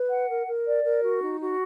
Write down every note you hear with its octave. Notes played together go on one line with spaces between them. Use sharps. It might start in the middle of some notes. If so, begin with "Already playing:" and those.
Already playing: B4
F#5
A#4
A#4
D5
A#4
F#4
D#4
F#4